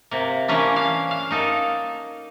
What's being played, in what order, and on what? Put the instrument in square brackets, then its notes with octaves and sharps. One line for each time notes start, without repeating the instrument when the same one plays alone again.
[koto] C3 A#3
E3 A#3 C#4 D4
F5
F5
A#3 D#4 A4